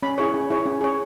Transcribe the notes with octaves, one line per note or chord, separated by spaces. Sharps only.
C#4 B5
E4 G#4 C#5
C#4
E4 G#4 C#5
C#4
G#4 C#5